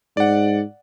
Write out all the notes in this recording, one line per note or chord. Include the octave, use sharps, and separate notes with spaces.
G#2 D5 F#5